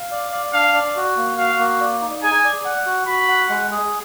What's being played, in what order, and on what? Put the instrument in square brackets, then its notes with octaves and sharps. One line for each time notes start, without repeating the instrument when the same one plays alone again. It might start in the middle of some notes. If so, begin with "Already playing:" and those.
Already playing: [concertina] F5
D5
D5
[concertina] D4 [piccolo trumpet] F5
[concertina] D5
F#4
A#3
[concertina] F#4 [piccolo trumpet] F5
[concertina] A#3
D5
D#4
[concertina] G#4 [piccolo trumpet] G#5
[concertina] D5
F#5
F#4
[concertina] F#4 [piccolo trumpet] B5
[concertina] F#5
G#3
G#4